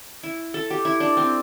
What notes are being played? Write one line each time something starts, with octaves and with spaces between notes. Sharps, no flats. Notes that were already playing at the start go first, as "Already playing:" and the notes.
E4
A4
G4
E4
D4
C4